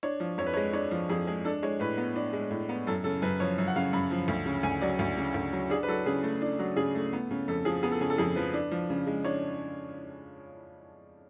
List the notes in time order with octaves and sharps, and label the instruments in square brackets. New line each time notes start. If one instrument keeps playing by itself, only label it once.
[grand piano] D4 C#5
F3
F2 C#5
B4
C#5
G#3
D4 C#5
F3
F2 G#4
G#3 G#4
D4 A4
G#3 C#5
A2 B4
B3
D4
G#3
A2
B3
F#2 A4
C#3 A4
F#2 B4
F3 C#5
F#2
F#5
C#3 F5
F#2 B5
F3
D2
C#3
D2 G#5
F#3 D5
D2
C#3
D2
F#3
D4 G#4
B4
F#3 A4
C#3 G#4
A3
D4
F#3
C#3 G#4
A3
B3
C#3
F2 A4
F3 G#4
B3 G#4
A4
C#3 G#4
A4
F2 G#4
F3 B4
D4
F3
C#3
G#3
D4 C#5